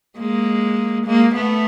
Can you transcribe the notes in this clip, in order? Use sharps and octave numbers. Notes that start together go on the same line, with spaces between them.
G#3 A#3
G#3 A#3
A3 B3